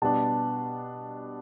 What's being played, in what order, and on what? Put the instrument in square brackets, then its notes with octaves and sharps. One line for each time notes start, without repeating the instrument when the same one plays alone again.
[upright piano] B2 G3 B3 D4 [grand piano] A5